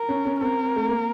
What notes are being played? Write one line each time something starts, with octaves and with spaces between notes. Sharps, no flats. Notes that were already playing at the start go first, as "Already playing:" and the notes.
Already playing: A#4
C#4
C#4
C4 A#4
A3
A#3